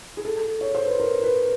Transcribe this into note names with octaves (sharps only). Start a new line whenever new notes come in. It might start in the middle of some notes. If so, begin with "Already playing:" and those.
G#4
A4
C#5
C5
B4
A#4
B4